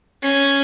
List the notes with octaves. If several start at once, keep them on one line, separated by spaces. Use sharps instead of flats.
C#4